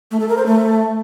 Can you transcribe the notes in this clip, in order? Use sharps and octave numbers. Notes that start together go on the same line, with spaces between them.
A3
A4
A#4
C5
A3